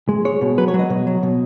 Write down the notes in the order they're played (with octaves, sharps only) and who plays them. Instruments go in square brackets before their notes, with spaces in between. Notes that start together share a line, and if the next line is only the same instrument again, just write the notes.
[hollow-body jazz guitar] G#3
G#3 C#5
B2
F#3 B4
C#5
F#3
D#5
B2
F#3
B2